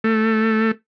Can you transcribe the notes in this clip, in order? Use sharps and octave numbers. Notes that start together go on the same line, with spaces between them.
A3